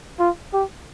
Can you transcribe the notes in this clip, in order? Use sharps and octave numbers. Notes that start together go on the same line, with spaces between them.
F4
G4